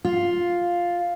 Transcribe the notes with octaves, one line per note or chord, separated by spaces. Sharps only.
F4